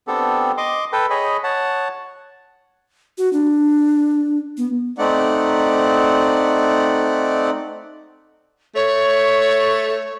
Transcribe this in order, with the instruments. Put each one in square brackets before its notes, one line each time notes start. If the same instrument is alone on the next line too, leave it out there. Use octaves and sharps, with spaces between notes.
[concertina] B3 C4 D4 G4 A4
D#5 C6 D6
A4 B4 G5
G#4 C#5 D#5 B5
C#5 F#5 A5
[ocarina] F#4
D4
B3
[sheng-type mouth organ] A3 C4 D#4 D5 F#5
[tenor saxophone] A3 [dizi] C#5